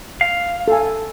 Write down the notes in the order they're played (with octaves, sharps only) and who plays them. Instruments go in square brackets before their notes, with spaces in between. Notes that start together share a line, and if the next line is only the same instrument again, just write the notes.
[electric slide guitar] F5
[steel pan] A4 G#5